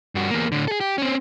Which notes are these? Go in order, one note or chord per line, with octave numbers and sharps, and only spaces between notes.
G2 F#4
E2 A#3
A2 D3
G#4 A4
G4
C4 C#4